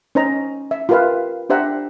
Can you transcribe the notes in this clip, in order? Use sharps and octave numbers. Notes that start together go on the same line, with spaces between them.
C#4 D#4 C5 D#5 A#5
E5
F4 G4 A#4 B4 E5 F5
D4 G4 C5 E5 F#5 A#5